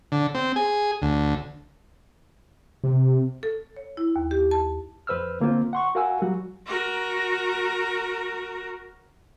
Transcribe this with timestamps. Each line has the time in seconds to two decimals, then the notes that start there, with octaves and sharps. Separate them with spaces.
0.12 D3
0.35 C4
0.56 G#4
1.02 D2
2.84 C3
3.43 A4
3.77 C#5
3.97 E4
4.16 D#2
4.31 G4
4.51 A5
5.07 F2 B4 C5 E6 F6
5.40 D3 A#3 C4 F4 C5
5.73 F#5 C6 C#6
5.95 F#4 A#4 F5 F#5 G#5 E6
6.22 F#3 G3 F#4
6.66 F#4 A#4